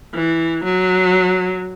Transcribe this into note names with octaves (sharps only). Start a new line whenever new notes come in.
E3
F#3